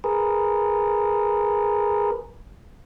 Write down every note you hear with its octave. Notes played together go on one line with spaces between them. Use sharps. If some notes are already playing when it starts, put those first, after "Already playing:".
G#4 A#4 B4